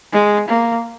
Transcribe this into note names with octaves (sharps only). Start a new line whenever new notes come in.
G#3
A#3